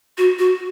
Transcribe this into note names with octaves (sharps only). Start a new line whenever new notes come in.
F#4
F#4